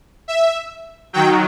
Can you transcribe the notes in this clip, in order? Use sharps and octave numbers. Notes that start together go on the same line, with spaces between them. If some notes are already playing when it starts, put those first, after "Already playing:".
E5
D#3 F#3 G5